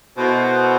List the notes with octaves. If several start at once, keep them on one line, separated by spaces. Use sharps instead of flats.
B2 B3 E4 A4 C5